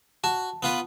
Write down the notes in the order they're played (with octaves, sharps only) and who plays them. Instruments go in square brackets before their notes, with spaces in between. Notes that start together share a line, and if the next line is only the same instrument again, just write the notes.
[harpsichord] F#4 [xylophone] A5
[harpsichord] B3 F4 B4